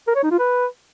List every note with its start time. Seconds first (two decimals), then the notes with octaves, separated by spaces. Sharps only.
0.08 A#4
0.16 C#5
0.24 D#4
0.31 F4
0.39 B4